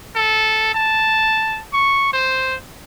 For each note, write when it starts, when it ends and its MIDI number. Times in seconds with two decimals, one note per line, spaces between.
0.15 0.70 69
0.75 1.61 81
1.73 2.13 85
2.13 2.57 72